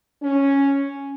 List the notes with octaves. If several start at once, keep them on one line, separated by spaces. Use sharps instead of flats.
C#4